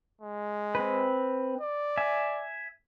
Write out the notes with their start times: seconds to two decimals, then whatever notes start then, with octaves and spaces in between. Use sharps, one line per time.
0.21 G#3
0.75 C4 B4
1.61 D5
1.97 E5 G#5